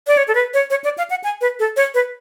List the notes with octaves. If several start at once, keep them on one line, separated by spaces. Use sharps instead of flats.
D5
C#5
A4
B4
C#5
C#5
D5
F5
F#5
G#5
B4
A4
C#5
B4